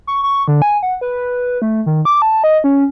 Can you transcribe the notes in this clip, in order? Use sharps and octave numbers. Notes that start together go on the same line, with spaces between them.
C#6
C#6
D3
G#5
F#5
B4
A3
D#3
D6
A5
D#5
C#4